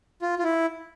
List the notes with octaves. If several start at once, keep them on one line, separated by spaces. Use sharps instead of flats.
F4
F4
E4